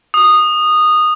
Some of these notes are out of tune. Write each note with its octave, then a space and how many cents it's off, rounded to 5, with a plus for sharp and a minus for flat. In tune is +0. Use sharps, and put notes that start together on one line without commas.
D#6 -15